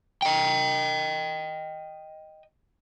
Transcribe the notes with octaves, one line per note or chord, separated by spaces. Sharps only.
D#5 G5